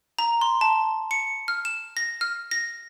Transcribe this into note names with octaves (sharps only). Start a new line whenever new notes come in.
A#5
C6
A5
C#7
F6
E7
A#6
F6
A#6